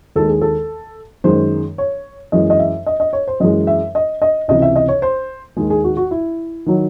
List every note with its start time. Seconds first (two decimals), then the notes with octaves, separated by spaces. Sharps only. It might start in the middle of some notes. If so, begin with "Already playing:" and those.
0.16 D#2 D#3 G#3 A4
0.29 G#4
0.41 A4
1.24 F#2 D#3 G#3 C5
1.78 C#5
2.32 F#2 E3 G#3 D#5
2.50 D#5
2.59 E5
2.86 D#5
3.00 D#5
3.13 C#5
3.27 C5
3.40 F#2 E3 G#3 D#5
3.67 E5
3.95 D#5
4.22 D#5
4.48 C#2 C3 E3 D#5
4.62 E5
4.76 D#5
4.88 C#5
5.02 C5
5.57 D#2 D#3 G#3 G#4
5.70 G#4
5.84 F#4
5.97 F#4
6.11 E4
6.66 D#3 F#3